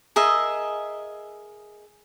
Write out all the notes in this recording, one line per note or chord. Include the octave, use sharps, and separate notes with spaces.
G#4 A#4 D#5 E5